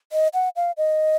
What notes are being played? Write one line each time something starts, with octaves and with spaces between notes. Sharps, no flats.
D#5
F#5
F5
D#5